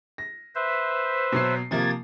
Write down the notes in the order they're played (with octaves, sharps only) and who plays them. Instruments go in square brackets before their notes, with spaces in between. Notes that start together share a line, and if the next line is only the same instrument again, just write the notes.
[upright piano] A#6
[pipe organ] B4 C5 E5
[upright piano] B2 F#3 C7
[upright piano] C3 F3 A#3 [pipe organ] G#6 A6